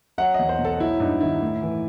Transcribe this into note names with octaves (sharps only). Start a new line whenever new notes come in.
F#3 F#5
E2 D#5
C5
B2
A4
F#3 E4
G2 D#4
D#3 E4
A2
E3